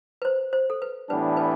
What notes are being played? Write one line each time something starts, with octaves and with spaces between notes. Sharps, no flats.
B4
C5
C5
A4
B4
A2 E3 G3 B3 D4 B4
B4